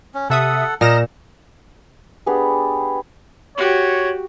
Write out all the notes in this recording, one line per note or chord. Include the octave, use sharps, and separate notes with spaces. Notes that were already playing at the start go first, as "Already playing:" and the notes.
C#4
C3 A4 E5 F#5 D#6
A#2 D#5 A#5 F6 A#6 E7
B3 D4 G4 G#4
F#4 G4 C#5